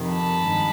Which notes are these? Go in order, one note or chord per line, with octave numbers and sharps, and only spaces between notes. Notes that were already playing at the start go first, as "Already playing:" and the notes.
Already playing: F2 C3 D#3
A5 B5
G2 D#3 G#3